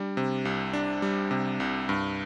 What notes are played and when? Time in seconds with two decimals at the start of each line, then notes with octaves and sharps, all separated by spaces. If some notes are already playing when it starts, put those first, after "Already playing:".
Already playing: G3 D4
0.17 C3
0.45 C2
0.73 D4
1.02 G3
1.31 C3
1.60 C2
1.89 G2